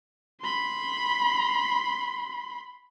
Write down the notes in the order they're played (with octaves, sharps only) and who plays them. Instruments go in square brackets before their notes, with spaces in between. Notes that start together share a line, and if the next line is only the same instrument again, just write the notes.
[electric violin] B5 C6